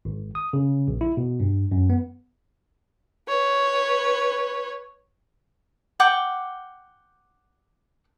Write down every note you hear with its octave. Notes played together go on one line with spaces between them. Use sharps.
G#1
D#6
C#3
A#1
E4
B2
G2
F#2
B3
B4 C#5
F#5 G5 D6